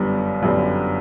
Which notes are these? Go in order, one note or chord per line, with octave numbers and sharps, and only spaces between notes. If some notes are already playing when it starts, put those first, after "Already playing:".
Already playing: G1 F#2 D3 G3 B3
G1 F#2 D3 G3 B3